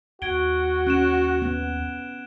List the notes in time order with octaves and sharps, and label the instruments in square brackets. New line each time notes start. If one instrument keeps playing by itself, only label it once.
[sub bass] D#2 [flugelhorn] F#4 [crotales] G#6 D7 G7
[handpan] C#4 [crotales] F#6 D7 E7
[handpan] B3